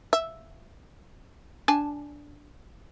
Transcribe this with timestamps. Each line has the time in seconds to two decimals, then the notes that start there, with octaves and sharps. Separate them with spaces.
0.13 E5
1.68 D4 G#5 A5